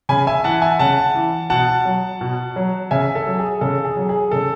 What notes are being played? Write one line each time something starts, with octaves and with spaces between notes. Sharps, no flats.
C#3 G#5 B5
E5 G#5
E3 F#5 A5
E5 G#5
C#3 F#5 A5
E3
B2 F#5 A5
F#3
B2
F#3
C#3 E5 G#5
A4
F#3
G#4
C#3 A4
G#4
F#3
G#4
C#3 A4